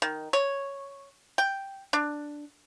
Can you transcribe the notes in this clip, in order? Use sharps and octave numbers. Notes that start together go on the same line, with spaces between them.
D#3
C#5
G5
D4